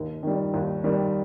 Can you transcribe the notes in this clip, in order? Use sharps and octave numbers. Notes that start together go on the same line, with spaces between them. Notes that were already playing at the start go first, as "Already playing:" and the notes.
Already playing: D#2
D#3 G3
D#2
D#3 G3